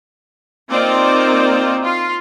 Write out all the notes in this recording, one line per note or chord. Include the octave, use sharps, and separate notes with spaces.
A#3 C4 D#4 F4 C5 D5
F4 C6